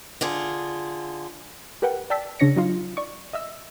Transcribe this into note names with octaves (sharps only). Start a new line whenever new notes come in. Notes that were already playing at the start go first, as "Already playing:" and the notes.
D3 F4 G#4
G4 A#4 B4 F#5 G5
D5 G5 A5 E6 B6
C#3 D4 C#5 A#6 C#7
F#3 D#4 F4
D5 C#6
D#5 E5 E6